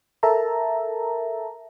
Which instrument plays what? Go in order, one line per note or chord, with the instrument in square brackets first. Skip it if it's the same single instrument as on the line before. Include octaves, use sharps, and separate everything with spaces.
[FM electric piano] A4 A#4 E5 A5 A#5